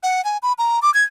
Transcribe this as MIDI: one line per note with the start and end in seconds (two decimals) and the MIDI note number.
0.03 0.24 78
0.24 0.37 80
0.43 0.53 83
0.58 0.79 82
0.82 0.93 86
0.94 1.03 92